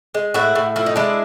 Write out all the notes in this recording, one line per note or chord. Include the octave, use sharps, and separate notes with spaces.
G#3
A2 E4 F#4
A2
F3 E4
D#4
G#3 D4 E4